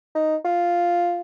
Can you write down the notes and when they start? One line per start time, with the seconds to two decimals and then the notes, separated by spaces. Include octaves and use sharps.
0.15 D#4
0.45 F4